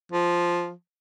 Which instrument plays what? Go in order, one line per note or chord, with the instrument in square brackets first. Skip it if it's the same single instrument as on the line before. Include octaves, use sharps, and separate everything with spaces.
[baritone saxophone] F3